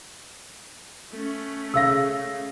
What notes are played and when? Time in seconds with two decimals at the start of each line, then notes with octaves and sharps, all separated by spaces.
1.12 A3 C#4
1.74 C#3 F5 E6 A#6